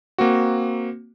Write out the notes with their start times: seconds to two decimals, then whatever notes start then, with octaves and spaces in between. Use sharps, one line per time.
0.18 A#3 C4 F#4